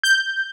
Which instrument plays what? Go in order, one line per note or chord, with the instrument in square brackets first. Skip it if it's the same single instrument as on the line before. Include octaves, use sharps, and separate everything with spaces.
[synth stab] G6